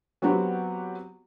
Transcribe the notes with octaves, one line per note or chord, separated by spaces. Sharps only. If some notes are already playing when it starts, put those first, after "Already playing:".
F#3 B3 C4 F#4 G4